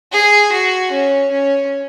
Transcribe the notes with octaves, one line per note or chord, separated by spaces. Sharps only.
G#4
F#4
C#4
C#4